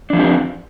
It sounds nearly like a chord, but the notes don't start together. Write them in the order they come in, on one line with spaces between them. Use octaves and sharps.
D4 F3 C4 G4